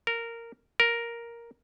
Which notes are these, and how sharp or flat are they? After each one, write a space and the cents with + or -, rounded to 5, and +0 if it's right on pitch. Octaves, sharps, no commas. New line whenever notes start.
A#4 -10
A#4 +5